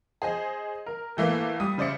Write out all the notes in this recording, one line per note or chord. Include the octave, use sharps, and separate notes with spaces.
G#4 C5 D#5
A#4
A2 E3 A3 A#3
G3 D#6
C#3 C5 D5 E5 C#7